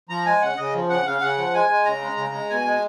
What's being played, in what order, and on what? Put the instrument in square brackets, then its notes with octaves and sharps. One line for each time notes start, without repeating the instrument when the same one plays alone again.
[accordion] F3 A#5
G#3 G#5
C#3 F#5
C#3 D#5
F3
C#3 F#5
C#3 F5
C#3 F#5
F3
G#3 G#5
G#3
C#3 A#5
G#3
C#3
G#3
B2 G#5
G#3